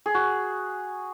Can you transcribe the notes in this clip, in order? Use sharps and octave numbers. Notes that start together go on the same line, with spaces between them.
G#4
F#4